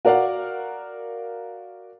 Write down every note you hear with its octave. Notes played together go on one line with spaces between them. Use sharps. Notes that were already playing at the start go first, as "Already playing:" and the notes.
F#4 A#4 D5 F5 F#5